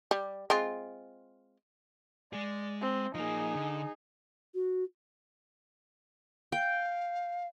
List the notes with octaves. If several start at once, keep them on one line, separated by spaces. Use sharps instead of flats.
G3
G#3 C4 F4
G#3 G#4 D5
C4
F3 A#3 D#4 G#4
D3
F#4
F5 G5